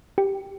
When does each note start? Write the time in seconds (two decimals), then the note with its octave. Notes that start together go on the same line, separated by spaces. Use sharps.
0.18 G4